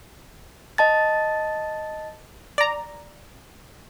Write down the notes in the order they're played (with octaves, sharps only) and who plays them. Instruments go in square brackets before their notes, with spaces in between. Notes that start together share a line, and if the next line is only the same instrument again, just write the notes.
[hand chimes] D#5 A5 A6
[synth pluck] D5 A#5